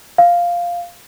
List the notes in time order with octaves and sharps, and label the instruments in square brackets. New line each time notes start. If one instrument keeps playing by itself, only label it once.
[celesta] F5